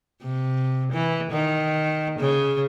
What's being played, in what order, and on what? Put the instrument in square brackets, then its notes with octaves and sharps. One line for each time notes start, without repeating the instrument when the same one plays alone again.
[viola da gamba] C3
E3
D#3
C#3